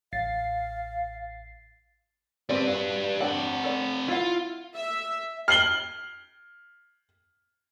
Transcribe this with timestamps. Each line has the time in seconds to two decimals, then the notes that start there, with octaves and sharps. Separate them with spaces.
0.13 A1 F5 A6 C7
2.49 G3 C4 B4 D5
2.67 F#4
3.21 C4 D4 F#5 G5
3.64 A4 D5
4.08 E4 F4 F#5
4.75 E5
5.48 F6 C7 F#7 G7